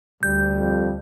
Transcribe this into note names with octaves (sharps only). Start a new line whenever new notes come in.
D2 G3 G6
F2